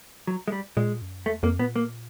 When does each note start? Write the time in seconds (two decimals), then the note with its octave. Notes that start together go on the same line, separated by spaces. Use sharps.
0.27 F#3
0.48 G#3
0.52 G3
0.77 A#2 G#3
1.02 F#2
1.26 E2 A3
1.43 F2 A#3
1.59 A#2 B3
1.76 A#3